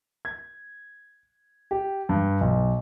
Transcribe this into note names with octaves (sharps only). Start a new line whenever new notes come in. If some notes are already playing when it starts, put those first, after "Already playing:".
G#6
G4
G2
B1